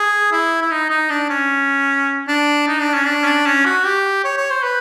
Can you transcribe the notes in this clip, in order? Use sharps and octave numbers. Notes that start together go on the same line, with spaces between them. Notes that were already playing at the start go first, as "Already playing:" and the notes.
Already playing: G#4
E4
E4
D#4
D#4
D4
C#4
D4
D#4
D4
C#4
D4
C#4
D4
C#4
F#4
G4
C#5
C#5
C5
B4